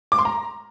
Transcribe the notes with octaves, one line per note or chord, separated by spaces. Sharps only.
D6
C6
A#5